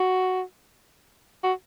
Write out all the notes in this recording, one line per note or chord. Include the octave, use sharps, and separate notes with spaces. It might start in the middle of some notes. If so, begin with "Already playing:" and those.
Already playing: F#4
F#4